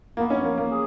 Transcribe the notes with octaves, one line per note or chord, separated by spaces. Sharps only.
A#3 B3
C#4
A#3
A#3
G#4